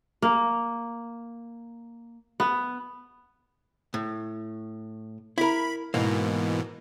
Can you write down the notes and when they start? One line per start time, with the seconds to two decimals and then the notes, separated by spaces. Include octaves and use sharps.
0.22 A#3
2.40 B3
3.94 A2
5.38 E4 A#4 B5
5.94 G#2 B2 E3 A#3